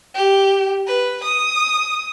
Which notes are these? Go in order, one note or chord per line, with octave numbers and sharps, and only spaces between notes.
G4
B4
D#6